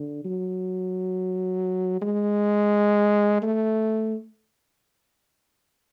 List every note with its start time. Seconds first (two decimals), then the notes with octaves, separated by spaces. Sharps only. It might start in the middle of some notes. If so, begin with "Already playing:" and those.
Already playing: D3
0.25 F#3
2.01 G#3
3.42 A3